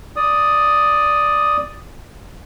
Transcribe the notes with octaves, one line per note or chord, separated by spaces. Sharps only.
D5 D#6